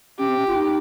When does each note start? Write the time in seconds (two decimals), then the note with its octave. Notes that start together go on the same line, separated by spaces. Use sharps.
0.19 C#4 G4
0.28 C4
0.38 C#4
0.47 F4
0.56 D#4